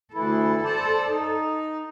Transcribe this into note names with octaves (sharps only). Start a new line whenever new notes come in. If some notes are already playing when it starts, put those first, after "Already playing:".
D2 E3 E4 A4
C5 D5 A5
D#4